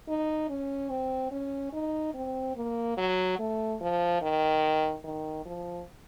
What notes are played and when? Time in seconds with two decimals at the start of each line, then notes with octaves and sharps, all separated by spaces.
0.08 D#4
0.49 C#4
0.90 C4
1.31 C#4
1.73 D#4
2.14 C4
2.56 A#3
2.97 F#3
3.39 A3
3.81 F3
4.22 D#3
5.04 D#3
5.45 F3